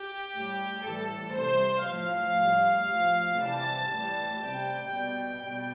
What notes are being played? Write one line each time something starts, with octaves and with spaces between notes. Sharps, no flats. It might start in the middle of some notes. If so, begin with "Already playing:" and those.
Already playing: G4
A2 G3
A2 E3 G3 A4
C3 G3 C5
A2 F3 F5
A2 G3
A2 F3
C3 E3 G3 A5
A2 E3 G3
C3 G3 G5
B2 G3
B2 G3 G5